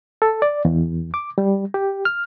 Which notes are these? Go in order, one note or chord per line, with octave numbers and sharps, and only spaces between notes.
A4
D5
E2
D6
G3
G4
F6